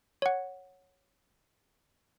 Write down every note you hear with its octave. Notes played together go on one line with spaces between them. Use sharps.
C#5 F#5